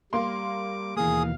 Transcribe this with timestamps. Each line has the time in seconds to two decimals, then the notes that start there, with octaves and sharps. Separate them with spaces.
0.13 G3 A#3 C6 D6
0.97 D#2 B2 E3 A#3 G#4 F5 D#6